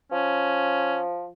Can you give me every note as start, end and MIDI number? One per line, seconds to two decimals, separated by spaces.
0.12 1.30 53
0.12 1.00 61